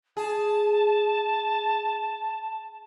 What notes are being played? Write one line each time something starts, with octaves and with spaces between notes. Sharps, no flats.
G#4 A5